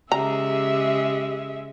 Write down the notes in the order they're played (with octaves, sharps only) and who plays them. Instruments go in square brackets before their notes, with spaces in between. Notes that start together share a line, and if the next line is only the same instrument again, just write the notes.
[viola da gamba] C#3 G#3 [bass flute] G4 [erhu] E5 [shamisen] A#5